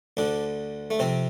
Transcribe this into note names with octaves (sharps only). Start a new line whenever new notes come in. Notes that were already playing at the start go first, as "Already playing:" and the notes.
D2 D3 D4
A3
F2 C3 C4